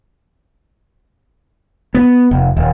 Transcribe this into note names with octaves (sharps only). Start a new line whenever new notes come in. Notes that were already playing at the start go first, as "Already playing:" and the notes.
B3
F1
D#1